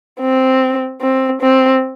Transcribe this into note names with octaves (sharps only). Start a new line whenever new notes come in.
C4
C4
C4